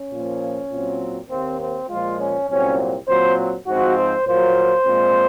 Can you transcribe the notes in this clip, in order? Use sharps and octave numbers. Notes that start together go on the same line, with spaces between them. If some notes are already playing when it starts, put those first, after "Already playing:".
Already playing: C#4
A#2 F3 A#3
A#2 F#3 C4
D#2 D#3 A#3 C4
C4
A#2 F3 G#3 F4
C#4
C2 A#2 F#3 C4 C#4
A#2 F#3 C4 C5
G#2 F3 C4 F#4
C5
A#2 F#3 A#3 C5
A#2 G#3 C4